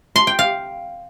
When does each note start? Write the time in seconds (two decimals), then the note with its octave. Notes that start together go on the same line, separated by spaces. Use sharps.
0.16 C6
0.27 G5
0.39 F5